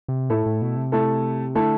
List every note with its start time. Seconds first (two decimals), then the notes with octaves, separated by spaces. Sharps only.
0.08 C3
0.30 A2 A3 E4 A4
0.46 A2
0.62 B2
0.76 C3
0.92 A3 E4 A4
1.55 D3 A3 E4 A4